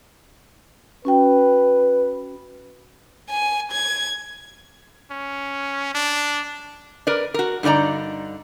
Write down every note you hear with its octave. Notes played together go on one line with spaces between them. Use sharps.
C#4 F#4 B4 G5
G#5
G#6
C#4
D4
A#4 B4 D5
F#4 A#4
G2 D3 D#4 D5 A#5